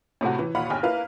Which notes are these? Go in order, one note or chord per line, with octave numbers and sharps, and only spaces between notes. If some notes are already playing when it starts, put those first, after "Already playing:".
A2 C3 A3 F#4
E3
D#2 A#2 F5 F#5 B5
G1 G5 G#5 F6
A#3 E4 B4 F5